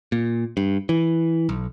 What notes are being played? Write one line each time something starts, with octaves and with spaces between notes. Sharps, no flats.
A#2
G2
E3
B1